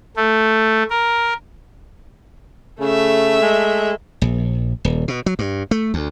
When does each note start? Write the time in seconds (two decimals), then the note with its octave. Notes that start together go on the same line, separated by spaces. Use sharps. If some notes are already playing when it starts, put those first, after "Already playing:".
0.16 A3
0.90 A#4
2.81 C#3 A3 E5
3.41 G#3
4.22 A#1
4.85 D#1
5.08 B2
5.26 F#3
5.39 G2
5.71 A3
5.94 D2